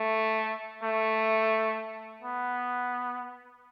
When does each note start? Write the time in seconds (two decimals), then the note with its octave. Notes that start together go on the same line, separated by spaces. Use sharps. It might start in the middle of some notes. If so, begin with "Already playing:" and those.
Already playing: A3
0.83 A3
2.22 B3